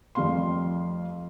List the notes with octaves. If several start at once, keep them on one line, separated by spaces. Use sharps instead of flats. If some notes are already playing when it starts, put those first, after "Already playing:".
F2 F3 G3 A3 F5 C6